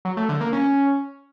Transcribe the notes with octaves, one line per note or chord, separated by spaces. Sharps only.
F#3
A3
D3
A#3
C#4